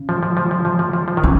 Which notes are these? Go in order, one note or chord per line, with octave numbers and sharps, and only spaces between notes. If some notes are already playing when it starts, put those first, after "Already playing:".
Already playing: C#3
F3
F3
F3
F3
F3
F3
F3
F3
D#3
C#3 E3